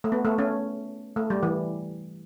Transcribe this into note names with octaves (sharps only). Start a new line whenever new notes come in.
A3
B3
A3
A3 C#4
A3
G3
E3